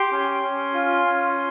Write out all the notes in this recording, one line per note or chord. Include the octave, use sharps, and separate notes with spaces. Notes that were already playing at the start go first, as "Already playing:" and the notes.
Already playing: G4 C6
C#4
C#4
F4
C#4